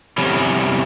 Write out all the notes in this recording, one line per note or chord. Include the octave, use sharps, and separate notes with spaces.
E2 C3 G3 C#4